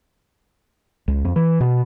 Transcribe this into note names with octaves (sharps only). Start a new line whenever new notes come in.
C#2
F2
E3
B2